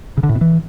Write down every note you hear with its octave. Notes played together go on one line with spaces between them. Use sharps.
C#3
D3
A2
B2
E3